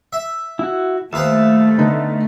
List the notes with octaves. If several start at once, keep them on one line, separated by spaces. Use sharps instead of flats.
E5
E4 F#4
D#2 A3 B4 C5 E5 F5
D3 B3 D#4